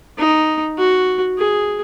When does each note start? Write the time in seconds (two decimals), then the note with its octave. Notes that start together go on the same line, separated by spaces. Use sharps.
0.18 D#4
0.78 F#4
1.38 G#4